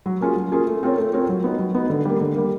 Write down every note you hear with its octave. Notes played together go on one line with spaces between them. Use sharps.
F#3
A#3 C#4 F4 G#4
F#3
A#3 C#4 F4 G#4
A3
C4 F4 A#4 C#5
A3
C4 F4 A#4 C#5
F#3
B3 D#4
F#3
B3 D#4
D3
G3 A#3
D3
G3 A#3